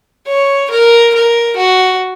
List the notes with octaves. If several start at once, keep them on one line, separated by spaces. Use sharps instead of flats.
C#5
A#4
A#4
F#4